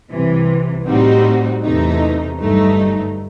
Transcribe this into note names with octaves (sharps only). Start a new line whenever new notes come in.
C2 C3 E3
A2 G3 C4 D#4 F#4
E2 C3 E3 A3 D#4
G1 G2 F#3 A3 D#4